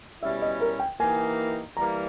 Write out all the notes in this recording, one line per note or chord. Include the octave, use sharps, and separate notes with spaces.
B2 G3 C#4 E4 E5
D#5
A#4
G5
E3 A#3 D#4 G4 G#5
E3 G3 A#3 A#5